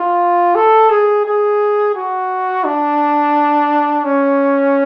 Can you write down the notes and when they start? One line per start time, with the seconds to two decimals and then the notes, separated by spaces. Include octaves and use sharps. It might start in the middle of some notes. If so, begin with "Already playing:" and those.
Already playing: F4
0.55 A4
0.90 G#4
1.25 G#4
1.95 F#4
2.64 D4
4.04 C#4